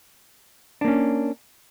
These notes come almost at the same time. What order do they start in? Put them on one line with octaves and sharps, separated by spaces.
D4 A#3 C#4